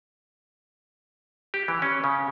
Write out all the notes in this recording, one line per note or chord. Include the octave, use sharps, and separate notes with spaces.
G4
E3
C#4
C#3